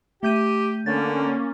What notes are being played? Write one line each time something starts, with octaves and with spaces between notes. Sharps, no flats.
A3 G4 G6 D#7
D3 A#3 C#4 A6